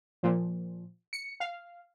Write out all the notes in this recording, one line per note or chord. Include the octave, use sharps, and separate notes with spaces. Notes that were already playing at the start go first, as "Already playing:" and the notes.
A#2 F3
C#7
F5